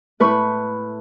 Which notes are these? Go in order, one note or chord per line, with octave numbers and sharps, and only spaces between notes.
A2 A3 B4 C#6